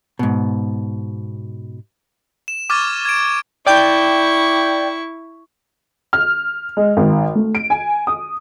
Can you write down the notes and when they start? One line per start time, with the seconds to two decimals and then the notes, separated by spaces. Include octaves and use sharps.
0.19 G#2 B2
2.48 E7
2.70 C#6 D6 F6 G#6 A6
3.05 G#6 D7
3.67 E4 D5 G5 C#6 G6
6.13 F6
6.77 G#3
6.97 G#1
7.35 A3
7.55 D7
7.70 G#5
8.07 D#6